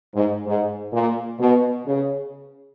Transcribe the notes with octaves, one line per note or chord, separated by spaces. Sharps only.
G#2
G#2
A#2
B2
C#3